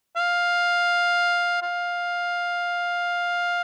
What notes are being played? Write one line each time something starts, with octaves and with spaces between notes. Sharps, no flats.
F5
F5